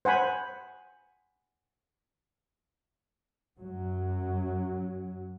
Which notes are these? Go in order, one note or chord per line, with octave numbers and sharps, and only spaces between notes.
C5 F#5 G#5 B5
F#2 F#3